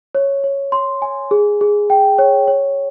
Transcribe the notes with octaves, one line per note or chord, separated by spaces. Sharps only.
C#5
C#5
C6
G#5
G#4
G#4
G5
C#5
C#5